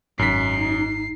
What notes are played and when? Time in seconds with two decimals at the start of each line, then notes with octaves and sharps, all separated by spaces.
0.19 G#1 F#2 D#4 B6 C7